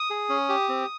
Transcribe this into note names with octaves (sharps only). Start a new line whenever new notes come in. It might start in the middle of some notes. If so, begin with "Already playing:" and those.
Already playing: D#6
G#4
C#4
G4
C4